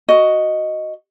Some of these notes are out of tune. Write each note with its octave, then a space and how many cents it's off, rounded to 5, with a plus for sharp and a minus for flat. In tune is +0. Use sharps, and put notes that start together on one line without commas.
F#4 +0 D#5 +0